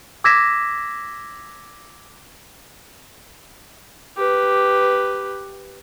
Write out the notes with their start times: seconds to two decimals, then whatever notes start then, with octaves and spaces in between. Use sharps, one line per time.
0.24 D6 E6 G#6 A#6 B6 E7
4.17 G4 B4